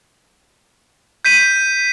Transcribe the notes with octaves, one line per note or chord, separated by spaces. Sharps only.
G6 B6 D#7